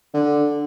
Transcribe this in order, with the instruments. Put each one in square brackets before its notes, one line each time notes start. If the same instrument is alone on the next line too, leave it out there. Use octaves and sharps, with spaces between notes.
[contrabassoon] D3